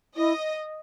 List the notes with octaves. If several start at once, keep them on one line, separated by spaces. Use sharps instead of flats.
E4 D#5